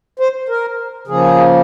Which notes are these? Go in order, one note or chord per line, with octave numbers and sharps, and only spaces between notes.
C5
A#4
C#3 F3 A#3 G#4